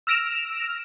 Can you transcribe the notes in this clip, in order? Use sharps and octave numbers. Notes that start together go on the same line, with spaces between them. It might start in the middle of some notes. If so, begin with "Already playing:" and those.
E6 F6 A#6 D7 E7 F7